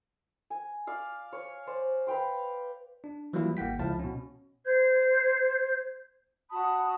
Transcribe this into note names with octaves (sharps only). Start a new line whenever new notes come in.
G#5
D5 F5
C#5
C5 D5
B4 F5 G5 C6
D4
E3 F#3 G3 A#3 E4 F4
G#1 A#3 F#5 G5 B6
C#2 F3 E4 F5 A5
B2 C#4
C5 G6 G#6
F#4 A5 B5 D#6